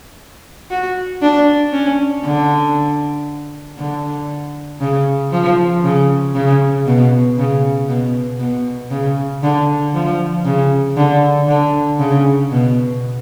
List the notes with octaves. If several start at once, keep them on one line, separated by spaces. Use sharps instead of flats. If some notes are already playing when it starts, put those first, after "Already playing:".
F#4
D4
C#4
D3
D3
C#3
F3
C#3
C#3
B2
C#3
B2
B2
C#3
D3
F3
C#3
D3
D3
C#3
B2